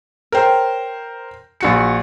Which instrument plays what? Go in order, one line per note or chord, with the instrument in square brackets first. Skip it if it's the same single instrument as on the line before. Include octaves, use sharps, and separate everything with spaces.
[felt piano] A#4 C5 [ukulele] C#5 G5 A#5
[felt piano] A#1 F#4 C#7